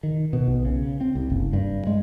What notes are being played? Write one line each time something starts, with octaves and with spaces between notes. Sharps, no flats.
D#3
B2
B1
C#3
C4
C2
F#1
G2
G#3